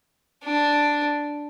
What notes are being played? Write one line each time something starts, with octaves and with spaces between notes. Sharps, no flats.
D4